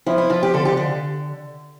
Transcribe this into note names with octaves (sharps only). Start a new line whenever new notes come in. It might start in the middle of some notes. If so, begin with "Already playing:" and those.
F3 E4
E4
F3 F4
G4
D3 A4
G4
D3